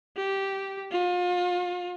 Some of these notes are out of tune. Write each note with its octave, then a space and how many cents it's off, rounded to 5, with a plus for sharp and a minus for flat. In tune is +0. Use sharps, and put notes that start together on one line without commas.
G4 -10
F4 +35